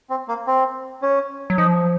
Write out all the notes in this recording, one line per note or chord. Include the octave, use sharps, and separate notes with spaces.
C4
A#3
C4
C#4
F#3
F3 D#4